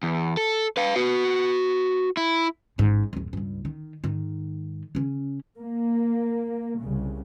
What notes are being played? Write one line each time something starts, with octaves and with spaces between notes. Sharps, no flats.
E2
A4
B4 F5
F#4 B4
E4
A1 G#2
D1 F#2
C#2 G2
D#3
G#2 D#3
C#3 C#4
A#3
C2 C#3